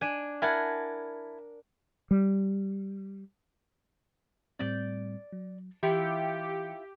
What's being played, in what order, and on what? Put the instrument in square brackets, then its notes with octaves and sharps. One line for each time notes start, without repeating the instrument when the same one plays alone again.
[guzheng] D4 G#5
[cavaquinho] E4 G#5 A5 [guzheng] A#4 F#5
[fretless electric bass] G3
[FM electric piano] A2 G3 C4 [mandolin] D5 G6
[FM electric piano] F#3
[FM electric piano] E3 C#7 [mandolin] E4 F4 G5 [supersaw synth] G4